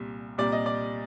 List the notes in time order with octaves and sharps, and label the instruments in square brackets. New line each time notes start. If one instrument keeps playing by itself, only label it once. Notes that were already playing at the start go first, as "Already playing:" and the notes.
Already playing: [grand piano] C2 A#2 G3
C2 A#2 G3 D5
D#5
D5